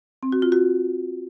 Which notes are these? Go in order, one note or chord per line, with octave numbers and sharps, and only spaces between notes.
C4
F#4
F4
F#4